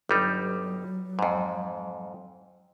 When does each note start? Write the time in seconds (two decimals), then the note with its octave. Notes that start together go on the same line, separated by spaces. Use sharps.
0.09 G1 F#3 G3 D#4
1.19 F2 G#2